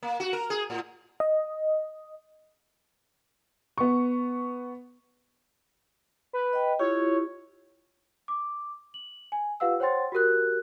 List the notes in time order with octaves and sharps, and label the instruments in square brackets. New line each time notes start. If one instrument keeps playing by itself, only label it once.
[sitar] A#3
F#4
A#4
G#4
A2
[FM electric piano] D#5
[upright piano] B3 C#6
[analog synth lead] B4
[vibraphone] D#5 G5
[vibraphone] E4 F4 G4 [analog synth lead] C#5
[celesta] D6
F#7
G#5
F4 G4 B4 F5 F#5 E6
C5 C#5 F#5 G5 C6 A6
F#4 G4 A#4 F#6